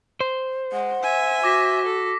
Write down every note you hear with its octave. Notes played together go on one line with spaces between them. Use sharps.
C5
G#3 F#5
E5 G#5
F#4 D6 A#6 B6
A4